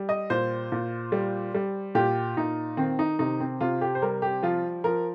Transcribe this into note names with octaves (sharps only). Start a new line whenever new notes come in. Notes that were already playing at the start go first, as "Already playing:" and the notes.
Already playing: G3
D#5
A#2 C5
A#2
G3
G3
A#2 G4
A#2 D#4
D#3 C4
D#4
C3 D#4
C4
C3 F4
G4
C5
G3 A#4
G4
F3 F4
F3 A#4